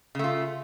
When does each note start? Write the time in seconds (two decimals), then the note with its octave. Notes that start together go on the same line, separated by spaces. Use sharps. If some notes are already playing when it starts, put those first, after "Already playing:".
0.15 C#3
0.19 A3
0.24 F4